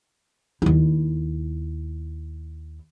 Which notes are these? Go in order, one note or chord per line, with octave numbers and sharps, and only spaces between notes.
D#2 E4